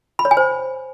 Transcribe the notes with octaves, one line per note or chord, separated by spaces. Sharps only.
B5
C#5
G#5
C5